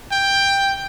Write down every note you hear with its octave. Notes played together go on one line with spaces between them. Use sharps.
G5